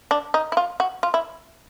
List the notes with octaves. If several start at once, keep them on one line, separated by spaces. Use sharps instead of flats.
D4
D#4
E4
F4
F#4
F4
E4